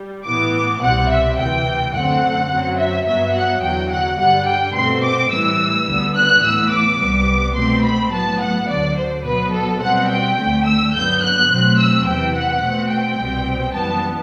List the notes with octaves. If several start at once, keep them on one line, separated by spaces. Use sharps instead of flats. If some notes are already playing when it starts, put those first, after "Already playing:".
Already playing: G3
A2 E3 B3 D6
C2 B2 G3 C4 F#5
E5
D2 C3 E3 G5
F#2 D3 A3 C4 F#5
F#2 F#3 C4
E5
G2 F#3 B3 E5
F#5
E2 D3 F#3 G5
F#5
G2 D3 G3 F#5
G5
B2 A3 C4 C6
D6
A2 E3 G3 E6
D2 D3 G3 B3
F#6
A2 E3 B3 E6
D6
C2 C3 G3 B3
B2 A3 C4 C6
B5
A2 F#3 B3 A5
F#5
D2 D3 F#3 D5
C5
B2 F#3 B3 B4
A4
B2 G3 C4 F#5
G5
D2 D3 A3
E6
G2 D3 F#3 B3 G6
F#6
B2 F#3 A3 C4
E6
E2 C3 E3 G5
F#5
B2 A3 C4
G5
C2 B2 G3 C4
F#2 E3 G3 B3 A5